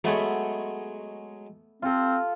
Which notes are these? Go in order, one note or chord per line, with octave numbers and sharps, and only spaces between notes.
F#3 G#3 A3 B3 C#5
C4 F4 A4